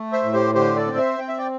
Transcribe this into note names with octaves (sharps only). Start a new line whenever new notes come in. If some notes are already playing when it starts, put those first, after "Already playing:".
Already playing: A3
C5 E5
A2
G4 C5
D3 G4 C5
A4 D5
C4 G5
C5 E5
C4 G5
E5
D5 G5